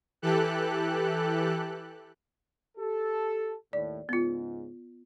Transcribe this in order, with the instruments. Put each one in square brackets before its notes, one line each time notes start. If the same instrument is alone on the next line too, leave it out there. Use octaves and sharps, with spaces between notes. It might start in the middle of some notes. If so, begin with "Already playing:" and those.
[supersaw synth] E3 G4 A4 F#6
[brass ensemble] G4 A4
[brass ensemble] D#2 A2 [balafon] D5
[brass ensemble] C#2 G#2 [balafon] B3 F4